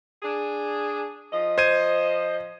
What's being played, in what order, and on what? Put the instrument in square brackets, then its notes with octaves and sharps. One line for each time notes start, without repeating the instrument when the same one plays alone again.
[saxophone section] D4 G#4
F3 D#5
[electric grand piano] C5 G#6 D#7